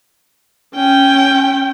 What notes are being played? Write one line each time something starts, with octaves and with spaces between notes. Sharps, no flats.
C#4 G5